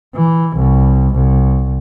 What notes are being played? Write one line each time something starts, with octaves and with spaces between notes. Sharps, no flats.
E3
C2
C2